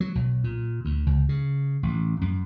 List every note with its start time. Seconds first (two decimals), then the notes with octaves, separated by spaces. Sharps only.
0.01 F#3
0.15 B1
0.44 A#2
0.85 D2
1.07 C#2
1.29 C#3
1.83 A1
2.21 F#2